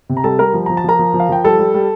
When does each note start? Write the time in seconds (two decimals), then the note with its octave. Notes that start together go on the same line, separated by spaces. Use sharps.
0.09 C3
0.17 A#5
0.24 G3 A4 A5
0.39 G3 A#4 A#5
0.54 F3
0.66 F3 A#5
0.77 A5
0.84 F3 A#4 A#5
0.99 F3
1.14 F3
1.20 F5
1.29 F3 G5
1.44 G3 A4 A5
1.59 G3
1.74 G3